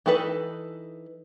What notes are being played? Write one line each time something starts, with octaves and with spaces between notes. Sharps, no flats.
E3 D#4 A4 B4